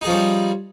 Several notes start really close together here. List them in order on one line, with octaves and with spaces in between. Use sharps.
D#4 G#4 F3 C#4 G3